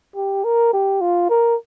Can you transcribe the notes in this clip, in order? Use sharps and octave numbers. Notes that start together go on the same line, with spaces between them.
G4
A#4
G4
F4
A#4